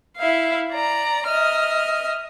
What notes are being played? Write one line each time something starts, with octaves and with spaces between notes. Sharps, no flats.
E4 E5 F5
D5 A#5
D#5 E5 F6